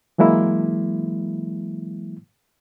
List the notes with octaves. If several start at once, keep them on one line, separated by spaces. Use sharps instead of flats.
E3 F#3 G#3 A#3 E4